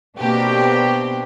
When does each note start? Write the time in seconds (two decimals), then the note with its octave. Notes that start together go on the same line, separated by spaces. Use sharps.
0.19 B2 A#3 C4 D4 G4